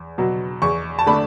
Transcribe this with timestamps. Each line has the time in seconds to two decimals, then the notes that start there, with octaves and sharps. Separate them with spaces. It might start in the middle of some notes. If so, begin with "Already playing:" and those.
Already playing: E2
0.18 B2 F#3
0.62 E2 C#6
0.99 A5
1.06 D3 A3 D4 B5